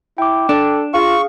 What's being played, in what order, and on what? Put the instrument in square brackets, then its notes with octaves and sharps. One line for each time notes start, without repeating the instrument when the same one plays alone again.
[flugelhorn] E4 [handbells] G5 D6
[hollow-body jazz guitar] D4 [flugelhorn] A4
[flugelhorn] F4 [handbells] G#4 F5 [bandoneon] C#6